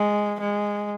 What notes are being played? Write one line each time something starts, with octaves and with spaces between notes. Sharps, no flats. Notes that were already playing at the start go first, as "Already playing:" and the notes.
Already playing: G#3
G#3